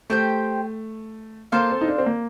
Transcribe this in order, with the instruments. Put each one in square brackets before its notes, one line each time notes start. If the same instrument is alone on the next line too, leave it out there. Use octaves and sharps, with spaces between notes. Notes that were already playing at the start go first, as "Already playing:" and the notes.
[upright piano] A3 [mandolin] G4 C5 G5
[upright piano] A#3 [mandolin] F4 A4 C5 F5
[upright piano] C4
D#4
D4
C4
A#3